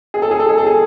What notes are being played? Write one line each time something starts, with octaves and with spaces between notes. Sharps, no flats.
G#4
A4
G#4
A4
G#4
A4
G#4